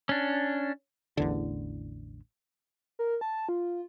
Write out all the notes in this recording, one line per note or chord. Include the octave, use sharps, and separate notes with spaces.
C#4 D4
A1 E2 D3
A#4
A5
F4